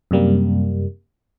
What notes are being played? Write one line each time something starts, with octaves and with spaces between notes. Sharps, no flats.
F#2 C3 G3 A#3